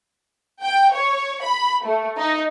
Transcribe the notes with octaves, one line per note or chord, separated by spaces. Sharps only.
G5
C#5
B5
A3
D#4